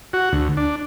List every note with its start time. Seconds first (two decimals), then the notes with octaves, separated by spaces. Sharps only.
0.13 F#4
0.32 D2
0.57 D4